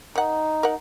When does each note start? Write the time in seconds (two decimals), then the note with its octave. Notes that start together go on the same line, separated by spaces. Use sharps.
0.16 D#3 D#4 F#5
0.63 A#4 F#5